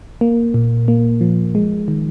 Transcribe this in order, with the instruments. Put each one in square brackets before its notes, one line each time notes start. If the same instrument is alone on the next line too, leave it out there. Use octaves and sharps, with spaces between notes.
[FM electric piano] A#3
A#2
A#3
F3
G#3
D#3